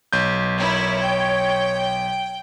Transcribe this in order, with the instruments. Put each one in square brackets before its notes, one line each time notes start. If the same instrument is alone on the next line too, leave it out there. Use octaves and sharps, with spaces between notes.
[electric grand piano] B1 G6
[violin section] E4 A#4 [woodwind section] C#5
[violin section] G5